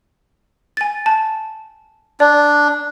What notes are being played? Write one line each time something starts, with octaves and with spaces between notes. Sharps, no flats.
G#5 A6
A5
D4 D5